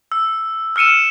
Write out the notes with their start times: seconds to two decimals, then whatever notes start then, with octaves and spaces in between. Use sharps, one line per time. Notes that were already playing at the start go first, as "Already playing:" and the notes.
0.12 E6
0.76 E6 F6 C#7 D#7 E7